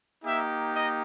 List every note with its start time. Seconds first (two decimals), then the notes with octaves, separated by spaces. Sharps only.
0.24 A#3 D#4 G4 E5
0.72 D#5